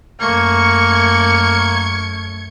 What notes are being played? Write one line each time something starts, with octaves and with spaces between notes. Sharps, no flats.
F#2 A3 A#3 C#6 G#6 C#7